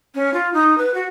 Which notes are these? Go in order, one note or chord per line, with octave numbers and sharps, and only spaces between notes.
C#4
F4
D#4
B4
F#4